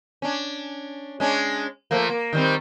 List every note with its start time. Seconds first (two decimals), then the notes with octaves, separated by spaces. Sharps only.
0.22 C#4 D4
1.20 G#3 C#4 D4
1.91 F3 A3 A#3
2.09 A#3
2.33 D#3 G3 C4